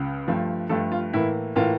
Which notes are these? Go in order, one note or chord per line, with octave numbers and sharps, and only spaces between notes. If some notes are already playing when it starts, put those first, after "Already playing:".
Already playing: C#2 C#3
G2 F3 A3
G2 F3 A3 A4
F4
A2 E3 A#3 E4
A2 E3 A#3 F4